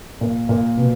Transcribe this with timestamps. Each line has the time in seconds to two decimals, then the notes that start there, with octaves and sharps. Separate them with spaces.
0.21 A#2
0.49 A#2
0.77 B2